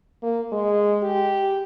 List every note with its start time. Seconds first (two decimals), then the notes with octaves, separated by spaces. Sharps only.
0.23 A#3
0.52 G#3
1.03 G4